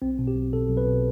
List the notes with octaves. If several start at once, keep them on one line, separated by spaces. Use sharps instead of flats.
B1 C4
B2
G4
B1
B2 A4
B1
B4
B2